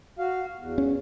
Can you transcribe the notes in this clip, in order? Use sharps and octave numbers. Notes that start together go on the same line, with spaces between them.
F#4 F5
E2
C#4